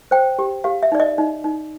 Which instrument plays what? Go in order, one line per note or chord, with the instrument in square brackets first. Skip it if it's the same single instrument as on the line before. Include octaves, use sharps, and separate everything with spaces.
[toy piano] C5 G5
G4
G4 F5
E5
D#4 D5
D#5
D#4
D#4